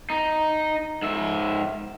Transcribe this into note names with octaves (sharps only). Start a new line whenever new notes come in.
D#4
G#2 E5